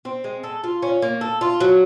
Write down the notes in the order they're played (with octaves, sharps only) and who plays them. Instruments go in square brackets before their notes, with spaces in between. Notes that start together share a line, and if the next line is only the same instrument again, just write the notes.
[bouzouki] C4
G#3
A4
F4
C#4
A#3
A4
F4
F#3